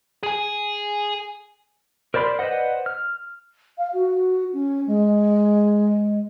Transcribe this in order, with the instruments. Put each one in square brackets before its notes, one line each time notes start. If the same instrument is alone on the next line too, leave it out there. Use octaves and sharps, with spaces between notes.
[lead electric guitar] G#4 G#5
[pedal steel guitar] A#4 C5 D5 B5 C6
B4 C5 D5 D#5 F#5
F6
[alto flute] F5
F#4
C#4
G#3